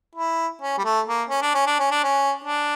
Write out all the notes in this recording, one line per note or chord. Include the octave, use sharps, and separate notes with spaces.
E4
C#4
G3
A3
A#3
C#4
D4
C#4
D4
C#4
D4
C#4
D4